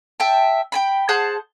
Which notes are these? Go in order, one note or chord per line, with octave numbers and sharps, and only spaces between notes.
E5 G5 A5
G5 G#5 B5
G#4 C5 F#5 A5